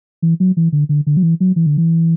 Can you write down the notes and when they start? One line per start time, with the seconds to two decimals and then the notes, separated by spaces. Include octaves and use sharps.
0.22 E3
0.40 F#3
0.57 E3
0.72 D3
0.89 D3
1.07 D3
1.17 F#3
1.23 E3
1.40 F#3
1.56 E3
1.66 D3
1.78 E3